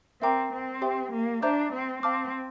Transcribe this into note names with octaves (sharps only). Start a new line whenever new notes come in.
C4 A#4 E5 G5 A#5 D6
C4
G4 C5 E5 G5 C6
A#3
D4 C5 E5 A#5 D6 G6
C4
C4 F5 A5 D6 F6